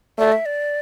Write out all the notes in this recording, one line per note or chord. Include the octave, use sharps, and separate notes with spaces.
A3 D5
E5
D5